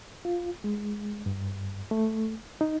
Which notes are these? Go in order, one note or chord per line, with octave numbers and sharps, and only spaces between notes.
F4
G#3
G2
A3
D#4